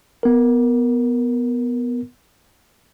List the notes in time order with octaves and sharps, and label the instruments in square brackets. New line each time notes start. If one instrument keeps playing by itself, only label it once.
[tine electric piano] B3 A#4